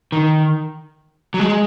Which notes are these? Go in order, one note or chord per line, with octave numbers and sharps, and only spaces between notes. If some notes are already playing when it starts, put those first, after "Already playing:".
D#3
F#3
G#3